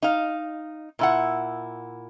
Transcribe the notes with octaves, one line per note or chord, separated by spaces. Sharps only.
D#4 F5
A#2 E4 F#5